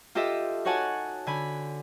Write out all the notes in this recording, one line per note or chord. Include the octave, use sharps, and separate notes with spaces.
F4 G4 A4 D#5 E5
D#4 F#4 C#5 F#5 G#5 A5
D3 G#5 B5